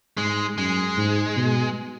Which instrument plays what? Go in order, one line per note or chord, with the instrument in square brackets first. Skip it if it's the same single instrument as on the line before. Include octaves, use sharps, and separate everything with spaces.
[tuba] G#2 [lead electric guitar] G#3
[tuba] F#2 [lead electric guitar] G#3
[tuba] G#2
B2